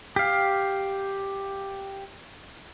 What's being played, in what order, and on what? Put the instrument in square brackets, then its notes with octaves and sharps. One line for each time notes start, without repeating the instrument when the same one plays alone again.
[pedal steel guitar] G4 F5